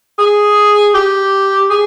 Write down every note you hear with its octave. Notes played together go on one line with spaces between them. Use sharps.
G#4
G4
G#4